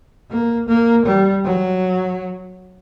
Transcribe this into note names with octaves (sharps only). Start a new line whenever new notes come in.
A#3
A#3
G3
F#3